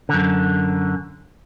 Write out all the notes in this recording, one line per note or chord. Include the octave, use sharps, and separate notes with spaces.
F#2 D3